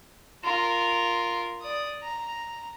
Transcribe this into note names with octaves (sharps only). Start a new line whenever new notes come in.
F4 A#4
D5 D#6
A#5